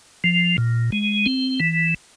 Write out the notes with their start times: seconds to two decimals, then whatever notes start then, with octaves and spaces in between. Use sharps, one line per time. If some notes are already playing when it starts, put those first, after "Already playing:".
0.24 F3
0.58 A#2
0.92 G#3
1.26 C4
1.60 E3